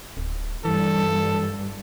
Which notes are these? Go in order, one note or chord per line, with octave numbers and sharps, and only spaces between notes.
D1
G2 E3 A4